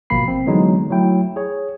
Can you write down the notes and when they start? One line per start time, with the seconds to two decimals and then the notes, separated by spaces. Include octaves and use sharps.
0.10 G#1 B2 F3 A#3 B5 C7
0.28 C4
0.46 D3 E3 F#3 G#3 B3 D#4
0.91 F#3 A3 E4 G5
1.36 G#4 C#5